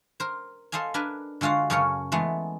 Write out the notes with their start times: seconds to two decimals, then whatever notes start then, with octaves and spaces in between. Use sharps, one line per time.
0.20 A#4 C5
0.72 A4 C5 D#5 F5 G#5
0.94 D4 A#4 B4 G#5
1.41 D3 G#3 F4 F#4 F5
1.70 F#2 C#3 C#4 A4 A#4 C#5
2.12 E3 G#3 A3 B3